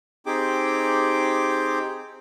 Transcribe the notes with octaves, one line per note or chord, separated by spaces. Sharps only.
C4 D#4 G4 G#4 G5 D6